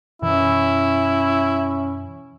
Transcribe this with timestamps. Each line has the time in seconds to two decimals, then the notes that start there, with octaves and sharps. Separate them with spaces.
0.22 F#2 B2 E3 C#4 E4